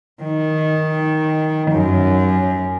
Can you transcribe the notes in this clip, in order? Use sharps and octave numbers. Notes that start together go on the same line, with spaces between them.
D#3
F#2